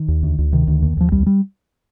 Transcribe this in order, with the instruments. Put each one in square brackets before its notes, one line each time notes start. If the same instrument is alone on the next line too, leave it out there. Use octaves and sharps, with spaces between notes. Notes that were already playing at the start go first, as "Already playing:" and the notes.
Already playing: [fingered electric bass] D#3
D#2
D2
D2
C3 D#3
D2
D#2
D#2 F3
C2 G3
G3